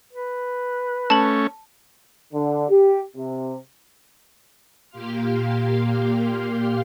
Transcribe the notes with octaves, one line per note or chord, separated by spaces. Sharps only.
B4
A3 C#4 A5 F#7
D3
G4
C3
A#2 A#3 G4 F5 C6 F6